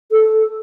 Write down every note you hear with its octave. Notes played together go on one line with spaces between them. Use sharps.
A4